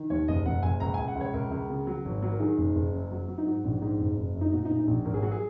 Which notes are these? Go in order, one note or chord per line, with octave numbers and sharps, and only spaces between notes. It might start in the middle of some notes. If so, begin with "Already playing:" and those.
Already playing: D#3
D#2 C#5
F#1 D#5
F#1 F#5
F#1 G#5
C#2 A#5
G#5
C#2
F#5
C#2 C#5
C#2 A#4
C#2
C#3
F#3
G#1
F#3
A#4
D#3 G#4
F#1
F#1
F#2
F#3
F#3
D#4
G#2 F#4
A#1
G#2
F#1
F#1
F#2
D#4
A#2 F#4
D#4
A#2
D#4
A#1
G#1 A#4
G#4
F#3 F#4
G#4